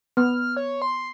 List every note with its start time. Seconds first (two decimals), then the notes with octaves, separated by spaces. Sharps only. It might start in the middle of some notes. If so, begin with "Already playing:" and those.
0.17 B3 F6
0.57 C#5
0.82 C6